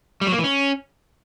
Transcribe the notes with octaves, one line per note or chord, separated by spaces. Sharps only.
G3
F#3
A#3
E3
C#4